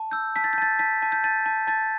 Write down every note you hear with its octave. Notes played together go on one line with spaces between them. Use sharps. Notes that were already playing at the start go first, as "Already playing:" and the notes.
Already playing: A5
E6 G6
A5 B6
A6
G6
A5 A6
A5 B6
A5
G6
A5 A6
A5
A5 A6